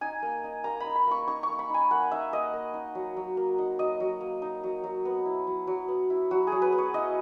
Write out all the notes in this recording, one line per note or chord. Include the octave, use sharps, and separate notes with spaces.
D#4 G#5
A#3
D#4
A#3 A#5
B5
D#4
B5
A#3 C#6
D#4 C#6
C#6
A#3
B5
D#4 G#5
A#3 F#5
D#4 E5
A#3 D#5
A#3
D#4
F#3
F#3
A#3
D#4
F#3 D#5
F#3
A#3
D#4
F#3
F#3
B3
E4
F#3
F#3
B3
E4
F#3 F#4
F#3 G#4
B4
B3
C#5
E4 D#5